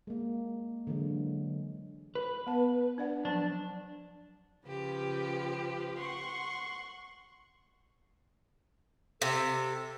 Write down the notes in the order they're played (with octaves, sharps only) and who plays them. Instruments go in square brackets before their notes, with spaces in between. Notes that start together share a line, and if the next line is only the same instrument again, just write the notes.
[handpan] G#3 A#3
D3 E3 F#3 G#3
[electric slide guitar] B4
[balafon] B3 A5
D4 D5 F#5
[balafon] F3 F#3 [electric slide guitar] D4
[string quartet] C#3 F3 G4 B4
F#5 C6 C#6
[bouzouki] C3 [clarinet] A4